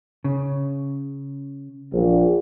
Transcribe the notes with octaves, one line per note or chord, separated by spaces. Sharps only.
C#3
A#1